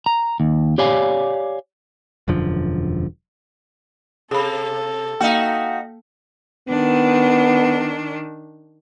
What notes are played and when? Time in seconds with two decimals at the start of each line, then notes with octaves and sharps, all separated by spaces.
0.06 A#5
0.40 D#2
0.78 G4 C#5 D5 F5 G#5
2.28 E1 F#2 D3 F3
4.31 C3 G#4 A4 B5
5.21 A#3 D#4 F#4 F5 G5
6.69 D#3 B3 D4